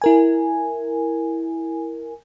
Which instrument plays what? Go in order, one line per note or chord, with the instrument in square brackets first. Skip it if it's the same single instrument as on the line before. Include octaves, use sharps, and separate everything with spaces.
[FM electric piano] E4 A#4 G#5